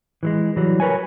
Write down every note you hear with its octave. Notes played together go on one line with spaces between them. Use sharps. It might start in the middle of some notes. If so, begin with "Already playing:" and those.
E3 F#3 G#3
E3 F#3 G3
A#4 B4 C#5 G#5